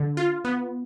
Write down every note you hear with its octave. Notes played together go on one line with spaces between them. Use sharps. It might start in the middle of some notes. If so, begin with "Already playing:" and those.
Already playing: D3
F4
B3